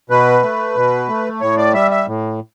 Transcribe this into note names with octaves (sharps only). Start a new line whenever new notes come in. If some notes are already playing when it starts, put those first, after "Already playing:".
B2 B4
A3
B2
A3
A2 C#5
D5
G3 E5
E5
A2